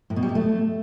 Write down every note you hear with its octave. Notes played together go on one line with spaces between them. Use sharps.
A2
B2
G3
C3
A3